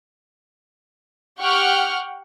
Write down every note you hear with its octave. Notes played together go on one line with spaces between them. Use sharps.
G4 F#5 G5 C#6 F6